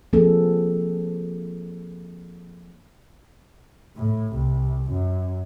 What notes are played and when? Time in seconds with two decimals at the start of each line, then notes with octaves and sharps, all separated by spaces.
0.13 F3 A#3 C4 G#4 A4
3.96 A2
4.33 C2
4.91 F#2